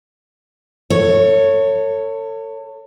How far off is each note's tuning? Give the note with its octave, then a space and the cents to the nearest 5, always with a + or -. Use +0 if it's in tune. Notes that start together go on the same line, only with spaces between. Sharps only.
A4 +35 C#5 -5